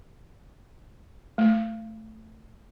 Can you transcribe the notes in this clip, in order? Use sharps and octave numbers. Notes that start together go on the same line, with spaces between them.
A3